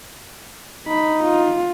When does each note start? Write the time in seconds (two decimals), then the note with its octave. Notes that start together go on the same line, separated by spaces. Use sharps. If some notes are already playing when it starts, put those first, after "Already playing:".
0.87 D#4 B5
1.24 F4